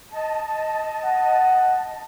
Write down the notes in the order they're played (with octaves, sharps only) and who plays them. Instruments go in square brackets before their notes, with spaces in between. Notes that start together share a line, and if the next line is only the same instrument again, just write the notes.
[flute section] D#5 A5
[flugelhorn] F#5